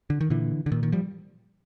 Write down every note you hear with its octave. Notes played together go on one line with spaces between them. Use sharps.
D3
D#3
A#2 D3 E3
D3
A#2 D#3
D#3
F3 G3